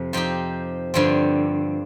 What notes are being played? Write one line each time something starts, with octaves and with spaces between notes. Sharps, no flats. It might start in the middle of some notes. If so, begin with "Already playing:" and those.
Already playing: F2 C3
F3 C4 D#4 G4
G2 D3 F3 C4